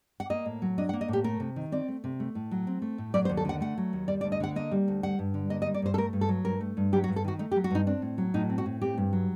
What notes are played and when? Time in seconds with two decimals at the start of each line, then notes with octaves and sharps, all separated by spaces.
0.20 F#5
0.30 A#3 D#5
0.46 A2
0.62 F#3
0.78 D4 D#5
0.89 F#5
0.93 A#3
1.01 D#5
1.08 A2 G4
1.24 A3 A#4
1.40 C3
1.56 D#3
1.72 C4 D5
1.88 A3
2.04 C3
2.20 A3
2.35 A2
2.51 F#3
2.67 C4
2.82 A3
2.98 A2
3.14 F#3 D5
3.25 C5
3.29 D#2
3.37 A4
3.45 D3 F#5
3.61 A3 F#5
3.78 F#3
3.93 D#2
4.08 G3 D5
4.21 D5
4.24 D2
4.32 D#5
4.40 D3 F#5
4.56 A#3 D#5
4.71 G3
4.88 D2
5.03 G3 F#5
5.19 G2
5.34 D3
5.50 A#3 D#5
5.62 D#5
5.66 G3
5.74 D5
5.82 G2 C5
5.94 A4
5.98 A3 A#4
6.13 G2
6.21 A4
6.29 F#3
6.45 G2 A#4
6.61 A3
6.77 G2
6.93 F#3 G4
7.04 F#4
7.08 G2
7.16 A4
7.24 D#3 F#4
7.39 A3 D#4
7.52 G4
7.56 F#3
7.64 F#4
7.71 G2 D#4
7.87 C4 D4
8.02 A2
8.18 F#3
8.34 A2 D#4
8.49 C4
8.58 F#4
8.66 A2
8.81 C4 G4
8.97 G2
9.13 F#3